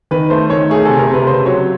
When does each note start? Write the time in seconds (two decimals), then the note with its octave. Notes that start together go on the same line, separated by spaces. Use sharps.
0.11 D#3 B4
0.30 A3 C5
0.50 D#3 C#5
0.70 A3 G#4
0.85 C3 A4
0.99 A#4
1.07 C3
1.14 B4
1.26 C#3 C5
1.46 F#3 C#5